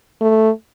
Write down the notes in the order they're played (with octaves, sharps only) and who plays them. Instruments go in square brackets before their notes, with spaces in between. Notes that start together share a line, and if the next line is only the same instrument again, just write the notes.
[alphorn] A3